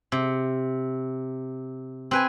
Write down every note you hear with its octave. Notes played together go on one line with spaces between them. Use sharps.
C3
C4 B4 G#5